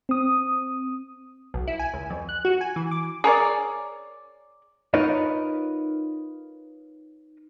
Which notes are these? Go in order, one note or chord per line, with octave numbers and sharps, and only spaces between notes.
C4 D#6
B1
E4
G#5
C#2
F2
F#6
F#4
G#5
E3
D6
G#4 A#4 C#5 D5
D#4 F4 A#4 B4 C#5 D#5